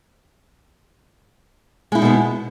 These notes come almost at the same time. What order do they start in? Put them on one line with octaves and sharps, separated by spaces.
G#3 E4 D#4 B2 B3